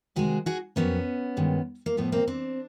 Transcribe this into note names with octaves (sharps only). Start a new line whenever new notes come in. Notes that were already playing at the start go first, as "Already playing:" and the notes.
C3 D#3 G#3 F#4 G#4
F#4 G#4
F2 C#3 F#3 A#3 B3 C#4
G2 D#3 G#3
A#3
A2 F3 A3 B3
A#3 C4
C4 D4